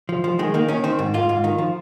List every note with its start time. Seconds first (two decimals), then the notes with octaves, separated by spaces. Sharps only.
0.09 F3
0.24 F3
0.39 D#3 G#3
0.54 D#3 A#3
0.68 D#3 C#4
0.84 D#3 C4
0.99 G#2
1.14 G#2 F4
1.29 G#2
1.44 D#3
1.58 F3